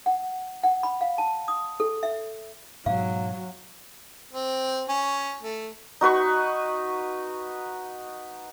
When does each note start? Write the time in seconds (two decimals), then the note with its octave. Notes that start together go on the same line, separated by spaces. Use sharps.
0.06 F#5
0.63 F#5
0.83 B5
1.01 F5
1.18 A5
1.48 D#6
1.80 A4
2.03 E5
2.86 G#2 B2 F#3 F5
4.33 C4
4.89 C#4
5.43 A3
6.01 D#4 F#4 B4 C#6